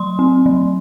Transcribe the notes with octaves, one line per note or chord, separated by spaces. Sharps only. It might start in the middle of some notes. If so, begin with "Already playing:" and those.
Already playing: F#3 C6
C4
F#3